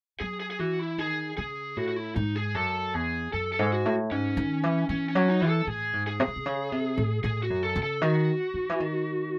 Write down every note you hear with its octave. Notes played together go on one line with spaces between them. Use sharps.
F#3 G#4
G#4
G#4
E3 F#4
E4
D#3 G#4
C#3 G#4
A2 F#4
F#4
E4
G#2 D#4
G#4
F#2 A4
E2 G#4
F#2 A4
A4
G#2
F#4
A2
G#2 C#4
D#3
E3
E3 C#4
C#4
F#3
D#4
E3
A4
A2 G#4
G#2
G#4
C3
C#3
C3
C#3
C3
A2
A2 G#4
F#4
F#2
A4
C#3
A4
D#3 F#4
D#3
E3
D#3